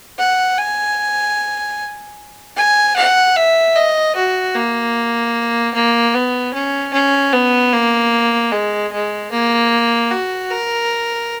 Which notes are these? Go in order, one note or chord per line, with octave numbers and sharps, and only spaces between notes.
F#5
G#5
G#5
F#5
E5
D#5
F#4
A#3
A#3
B3
C#4
C#4
B3
A#3
G#3
G#3
A#3
F#4
A#4